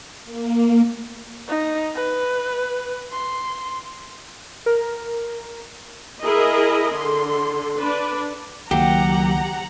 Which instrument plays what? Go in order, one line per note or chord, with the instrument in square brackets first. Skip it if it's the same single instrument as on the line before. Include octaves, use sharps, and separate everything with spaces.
[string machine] A#3
[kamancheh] D#4
B4
C6
[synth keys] A#4
[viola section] E4 G#4 A#4 D#5
D3 C6
D4 B4
[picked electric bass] C#2 D#3 A#3 [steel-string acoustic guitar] F#3 [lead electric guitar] G4 [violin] F#5 A#5